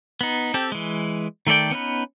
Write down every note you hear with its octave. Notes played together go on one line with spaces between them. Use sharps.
B3 D#4
C4 G4 A4
E3 G#3
D#3 A3 A4 D5 G5
B3 C#4 D#4 B4